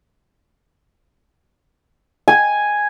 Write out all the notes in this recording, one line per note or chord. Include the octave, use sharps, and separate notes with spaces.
G#5